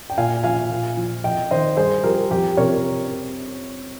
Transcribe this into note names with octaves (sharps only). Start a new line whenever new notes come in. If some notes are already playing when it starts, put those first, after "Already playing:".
G5
A#2 F5 G#5
F3 F5 G#5
A#2
F3
F2 D#5 G5
D#3 C5 D#5
G2 G#4 C5
F3 G4 A#4
F2 G4
C3 F3 A#4 C#5